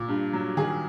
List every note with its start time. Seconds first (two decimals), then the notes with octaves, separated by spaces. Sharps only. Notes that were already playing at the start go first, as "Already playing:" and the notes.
Already playing: A#2
0.08 G2
0.33 F#3
0.56 D#3 G#4